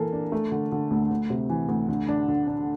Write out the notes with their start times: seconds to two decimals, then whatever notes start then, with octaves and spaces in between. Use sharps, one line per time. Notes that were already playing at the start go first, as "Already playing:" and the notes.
Already playing: E3 A#3 A4
0.13 D4
0.32 A3
0.52 D3
0.72 D3
0.91 D2
1.10 D2
1.30 C3
1.50 E3
1.68 D2
1.88 D3
2.08 D4
2.28 D3
2.47 D4